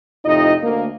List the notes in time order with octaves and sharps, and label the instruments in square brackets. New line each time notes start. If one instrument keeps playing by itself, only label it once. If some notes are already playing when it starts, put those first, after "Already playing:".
[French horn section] F2 A2 C3 D#4 F4 D#5
D2 A#3